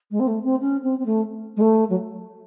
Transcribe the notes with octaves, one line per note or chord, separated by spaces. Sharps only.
G#3
C4
A3
C4
C#4
C4
C4
A3
G#3
A3
F#3